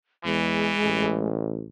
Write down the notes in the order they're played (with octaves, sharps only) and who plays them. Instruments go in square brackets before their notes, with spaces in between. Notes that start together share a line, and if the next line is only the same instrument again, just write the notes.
[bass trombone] E2 [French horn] E3 [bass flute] G#3
[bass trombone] A1